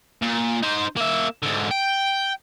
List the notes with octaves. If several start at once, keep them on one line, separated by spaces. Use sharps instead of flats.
A#2
D#4 C5
A#3 E5
G#2 D3
G5